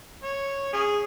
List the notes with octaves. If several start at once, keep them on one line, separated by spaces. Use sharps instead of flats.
C#5
C#4 G#4